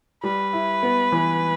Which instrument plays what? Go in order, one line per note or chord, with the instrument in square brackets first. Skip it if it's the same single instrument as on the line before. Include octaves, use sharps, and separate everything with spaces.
[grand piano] G3 [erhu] B4
[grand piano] E4
B3
E3